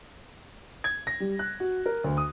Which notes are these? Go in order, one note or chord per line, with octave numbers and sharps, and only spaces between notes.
G#6
A#6
G3
F#6
F#4
A#4
D2
D#6